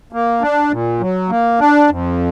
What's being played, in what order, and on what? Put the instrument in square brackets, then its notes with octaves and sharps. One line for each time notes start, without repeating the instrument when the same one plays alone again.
[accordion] A#3
D4
A#2
F#3
A#3
D4
F2